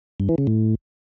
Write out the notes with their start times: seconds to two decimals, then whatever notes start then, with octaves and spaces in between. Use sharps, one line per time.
0.20 G2
0.29 E3
0.38 C#3
0.47 A2